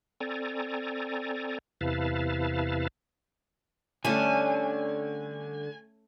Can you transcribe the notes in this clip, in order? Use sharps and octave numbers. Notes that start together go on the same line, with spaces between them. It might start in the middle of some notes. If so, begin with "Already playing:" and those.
C4 A4 D5 G#5 A#5
E2 C3 E4 B4 F5 A5
D3 G3 A3 C#4 A4 G#5